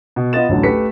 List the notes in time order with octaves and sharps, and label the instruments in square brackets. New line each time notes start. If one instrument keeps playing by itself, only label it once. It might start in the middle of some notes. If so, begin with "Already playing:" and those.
[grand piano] B2
B3 F4 D#5 A6 E7
A1 D2 D3 F#3
A3 G4 B4 B6 C#7